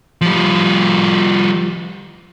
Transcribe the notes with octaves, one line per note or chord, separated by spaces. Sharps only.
F3 G3